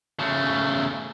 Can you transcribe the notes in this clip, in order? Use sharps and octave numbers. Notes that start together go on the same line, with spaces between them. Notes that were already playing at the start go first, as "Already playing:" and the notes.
C#3 A3